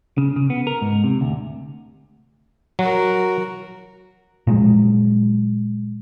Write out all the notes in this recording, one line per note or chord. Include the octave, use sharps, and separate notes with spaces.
C#3
C#3
B3
A#4
G#2
C3
D2
F#3 F#4 A#4
A#2 F3 F#3 G#3